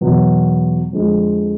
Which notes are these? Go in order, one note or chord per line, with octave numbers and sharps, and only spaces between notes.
E2 B2 F#3 B3
F2 D3 F3 G#3